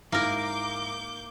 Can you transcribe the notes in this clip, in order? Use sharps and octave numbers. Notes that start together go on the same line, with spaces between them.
G#2 A#3 E4 A#4 D6 G6